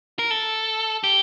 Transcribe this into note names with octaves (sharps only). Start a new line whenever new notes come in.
A#4
A4
G4